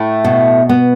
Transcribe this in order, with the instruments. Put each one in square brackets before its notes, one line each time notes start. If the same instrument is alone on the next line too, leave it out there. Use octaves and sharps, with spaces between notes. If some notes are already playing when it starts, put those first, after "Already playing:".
Already playing: [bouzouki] A2 A3 [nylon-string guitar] E4
[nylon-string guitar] B2
B3